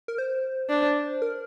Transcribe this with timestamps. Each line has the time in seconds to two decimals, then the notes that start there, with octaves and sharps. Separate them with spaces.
0.08 A#4
0.18 C5
0.70 D4
1.22 A#4